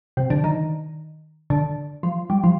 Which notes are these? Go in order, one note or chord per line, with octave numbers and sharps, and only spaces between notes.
C3
D3
D#3
D3
F3
G3
F3